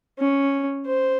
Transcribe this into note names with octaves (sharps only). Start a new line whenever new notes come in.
C#4
C5